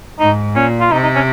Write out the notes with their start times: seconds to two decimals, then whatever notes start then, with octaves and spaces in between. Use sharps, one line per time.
0.19 G#2 D#4
0.55 A#2 C#4
0.80 F4
0.92 C3 D#4
1.03 D#4
1.15 C#4